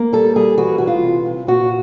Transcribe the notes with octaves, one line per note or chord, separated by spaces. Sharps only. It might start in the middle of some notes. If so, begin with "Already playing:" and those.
Already playing: A#3
G3 A4
G3 G#4
E3 F#4
E3 F#4
F4
C3
C3
A#2 F#4